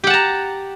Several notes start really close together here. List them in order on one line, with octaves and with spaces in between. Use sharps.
G4 F#5 A5 A#5